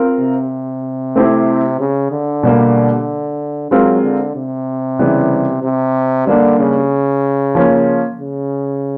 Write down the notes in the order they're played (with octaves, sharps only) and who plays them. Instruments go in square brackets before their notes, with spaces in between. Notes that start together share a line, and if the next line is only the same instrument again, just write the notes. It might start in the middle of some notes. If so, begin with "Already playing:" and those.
Already playing: [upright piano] C4 F4 A#4
[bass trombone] C3
[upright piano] A3 C4 E4 G4 C5
[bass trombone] C#3
D3
[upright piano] B2 G3 A#3
[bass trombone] F#3 [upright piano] G#3 C4 F4 A#4
[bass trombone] D3
C3
[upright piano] C#3 E3 G3 B3 E4
[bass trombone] C3
[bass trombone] D3 [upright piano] G3 A#3 D4
[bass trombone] C#3
[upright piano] F3 A#3 C#4 F4
[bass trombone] C#3